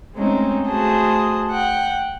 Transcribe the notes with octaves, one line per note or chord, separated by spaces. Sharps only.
G#3 A3 C4 C#4 D#4
A3 F#4 G#4 C5 A5 D#6
F#5 G5